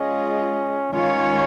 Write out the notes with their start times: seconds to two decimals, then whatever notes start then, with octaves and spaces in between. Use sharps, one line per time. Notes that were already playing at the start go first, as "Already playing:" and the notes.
Already playing: G#3 C#4 F4 G#4 D#5
0.93 D#3 G#3 C#4 F4 C#5